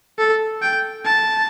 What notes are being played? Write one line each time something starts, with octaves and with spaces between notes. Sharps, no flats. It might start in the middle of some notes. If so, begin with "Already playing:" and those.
A4
G5
A5